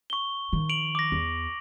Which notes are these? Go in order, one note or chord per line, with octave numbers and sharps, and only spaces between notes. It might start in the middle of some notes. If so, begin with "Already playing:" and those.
C#6 G7
D#3 F3
D7 F7 F#7
D6 A#6
E2